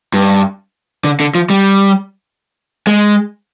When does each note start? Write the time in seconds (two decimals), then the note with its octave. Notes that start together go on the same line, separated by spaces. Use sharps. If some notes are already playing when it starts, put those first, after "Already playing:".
0.14 G2
1.04 D3
1.20 D3
1.35 F3
1.50 G3
2.87 G#3